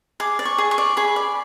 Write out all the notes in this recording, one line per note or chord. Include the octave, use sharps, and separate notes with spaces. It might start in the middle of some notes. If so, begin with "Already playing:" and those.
G#4 D6
D5
C#6
G#4
C#6
D5
G#4 B5
D5